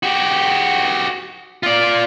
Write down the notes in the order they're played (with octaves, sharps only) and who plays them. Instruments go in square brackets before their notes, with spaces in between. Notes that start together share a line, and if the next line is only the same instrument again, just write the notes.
[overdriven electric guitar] F#4 G4
F4 D5